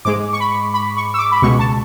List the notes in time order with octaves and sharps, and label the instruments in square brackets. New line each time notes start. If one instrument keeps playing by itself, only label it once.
[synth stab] G#2 G#3 D6
C#6
B5
B5
C#6
E6
D6
B5
C#2 B2 G#3 C#6
A5